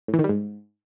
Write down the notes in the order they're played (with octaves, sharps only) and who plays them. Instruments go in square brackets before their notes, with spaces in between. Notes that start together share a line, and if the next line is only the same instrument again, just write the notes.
[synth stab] A2
E3
D#3
G3
G#2